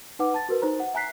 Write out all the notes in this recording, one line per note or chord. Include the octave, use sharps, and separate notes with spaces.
D#4 B4 F#5 D6
A5 A6
F#4 A#4 B4
D#4 C5 A#5
F#5
E5 G#5 A#5 F#6 B6 C7